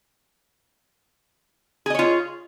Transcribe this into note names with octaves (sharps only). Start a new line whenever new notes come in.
F4 G#4 C#5 D#5